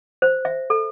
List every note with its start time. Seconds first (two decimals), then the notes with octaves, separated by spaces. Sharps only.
0.22 C5
0.45 E5
0.70 A4